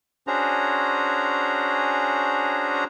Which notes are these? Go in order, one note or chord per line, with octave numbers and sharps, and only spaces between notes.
C#4 D4 F#4 G#4 C5 A#5